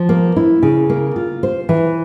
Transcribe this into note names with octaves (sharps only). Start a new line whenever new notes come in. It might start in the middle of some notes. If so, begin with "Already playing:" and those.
Already playing: F3
A#3
E4
C#3
A#3
F4
C5
E3